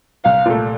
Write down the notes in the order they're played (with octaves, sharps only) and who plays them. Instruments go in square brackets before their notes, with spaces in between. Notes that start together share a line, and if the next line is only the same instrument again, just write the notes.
[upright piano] C2 [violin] F5
[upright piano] A#2 A3